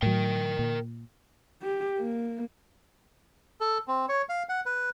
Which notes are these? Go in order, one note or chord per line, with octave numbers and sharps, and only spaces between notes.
A2 F#3 A#4 G5
A#2
G4
A#3
A4
C4
C#5
F5
F#5
B4